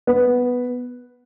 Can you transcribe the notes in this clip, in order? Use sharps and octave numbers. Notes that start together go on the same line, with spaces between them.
B3